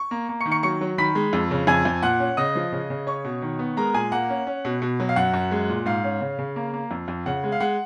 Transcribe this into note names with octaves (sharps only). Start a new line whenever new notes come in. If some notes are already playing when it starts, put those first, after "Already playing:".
Already playing: C#6
A#3
A#3
C#6 C#7
D#3
C#6 C#7
F#3 C#6 C#7
F#3
D#3 B5 B6
G#3
F2
C#3
F2 G#5 G#6
F2
A#2 F#5 F#6
C#4
C#3 D#5 D#6
F3
C#3
C#3
C#4 C#5 C#6
B2
D#3
B3
G#3 A#4 A#5
A#2 G#4 G#5
A#3 F#5
C#4
C#4
B2
B2
F#3
F5
F#2 F#5
F#2
G#3
A#2
G#2 F5
C#4
C#3
C#3
A#3
A#3
F2
F2
C#3 F#5
G#3
F5
G#3 F#5